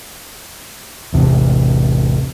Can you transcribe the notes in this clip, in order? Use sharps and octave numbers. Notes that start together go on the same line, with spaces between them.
A1 E2 C3